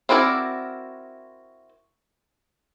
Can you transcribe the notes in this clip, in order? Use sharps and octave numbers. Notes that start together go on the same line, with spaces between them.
C4 E4 F#4 A#4 D5